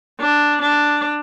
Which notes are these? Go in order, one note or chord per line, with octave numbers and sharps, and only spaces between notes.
D4
D4